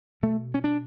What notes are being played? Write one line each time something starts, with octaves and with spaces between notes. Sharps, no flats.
B2 A3
C#4
D4